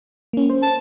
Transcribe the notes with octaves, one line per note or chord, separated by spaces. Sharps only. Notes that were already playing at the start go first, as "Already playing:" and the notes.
A#3 C#4
C5
A5